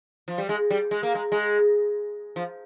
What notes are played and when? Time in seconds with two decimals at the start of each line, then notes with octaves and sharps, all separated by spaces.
0.28 F3
0.38 G3
0.49 G#3
0.71 G3
0.91 G#3
1.03 A#3
1.15 G#3
1.32 G#3
2.36 F3